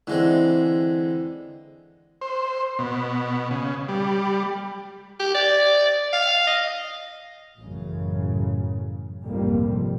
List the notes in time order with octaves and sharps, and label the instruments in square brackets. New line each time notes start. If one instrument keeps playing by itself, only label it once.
[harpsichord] D3 G#3 C4 [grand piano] E3
[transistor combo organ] C5
B2
C#3
G3
[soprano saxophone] G4
D5
F5
D#5
[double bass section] A1 F#2 C#3 F#3
F1 A#1 F2 G#2 G3 A#3